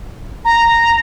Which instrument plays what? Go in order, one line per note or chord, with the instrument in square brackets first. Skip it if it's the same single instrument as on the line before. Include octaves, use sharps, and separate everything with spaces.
[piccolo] A#5